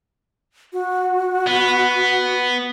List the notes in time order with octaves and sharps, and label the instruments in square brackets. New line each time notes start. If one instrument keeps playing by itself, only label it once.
[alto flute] F#4
[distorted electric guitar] B3